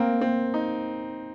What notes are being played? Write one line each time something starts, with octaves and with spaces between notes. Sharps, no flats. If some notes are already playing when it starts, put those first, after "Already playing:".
Already playing: A#3 C4
C4
D#4